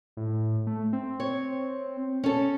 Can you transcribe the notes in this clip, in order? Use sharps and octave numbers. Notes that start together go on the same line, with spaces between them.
A2
A3
C4
C#5
C#4 A4